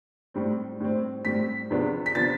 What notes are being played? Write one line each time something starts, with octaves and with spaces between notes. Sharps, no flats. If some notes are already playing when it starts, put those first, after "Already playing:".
A2 G3 C4
A2 G3 C4
A2 G3 C4 B6
E2 C3 F3 B3 D4
B6
C3 F3 B3 D4 A6